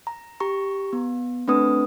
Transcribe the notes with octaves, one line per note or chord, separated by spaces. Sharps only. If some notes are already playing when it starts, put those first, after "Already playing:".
A#5
G4 A#5 C#6
B3
A3 C4 D4 B4 D#6